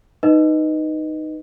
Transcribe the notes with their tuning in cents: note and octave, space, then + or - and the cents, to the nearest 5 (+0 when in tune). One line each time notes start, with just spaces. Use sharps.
D#4 -5 B4 +0 D#5 +0